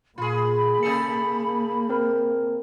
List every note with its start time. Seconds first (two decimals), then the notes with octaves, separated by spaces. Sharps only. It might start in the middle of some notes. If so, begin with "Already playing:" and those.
0.18 A#2 F4 G#4 B5
0.83 C3 A#3 G#4 A4 C#7
1.89 C4 A#4